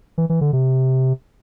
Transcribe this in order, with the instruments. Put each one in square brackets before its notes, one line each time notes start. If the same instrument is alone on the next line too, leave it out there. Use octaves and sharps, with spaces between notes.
[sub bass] E3
E3
D3
C3